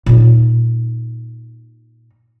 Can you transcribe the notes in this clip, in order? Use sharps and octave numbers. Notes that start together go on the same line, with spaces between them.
A#2 D#4